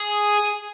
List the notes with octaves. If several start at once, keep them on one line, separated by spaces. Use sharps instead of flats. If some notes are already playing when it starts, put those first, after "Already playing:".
Already playing: G#4